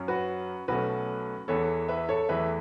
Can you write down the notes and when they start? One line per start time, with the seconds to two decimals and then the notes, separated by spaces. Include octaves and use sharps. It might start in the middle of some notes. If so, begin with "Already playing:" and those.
Already playing: F#2 F#3 C#4
0.08 F#4 B4
0.68 B1 B2 A3 C#4 F#4 B4
1.48 E2 E3 B3 A4 C#5
1.88 B4 E5
2.09 A4 C#5
2.29 E2 E3 A3 B4 E5